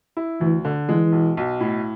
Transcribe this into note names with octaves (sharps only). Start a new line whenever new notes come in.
E4
D2 E3
D3
E3 G#3
B1
B1
A2